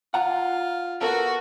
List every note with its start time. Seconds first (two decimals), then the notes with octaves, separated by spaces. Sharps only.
0.14 F4 F#5 A#5
1.01 B3 F#4 A4 A#4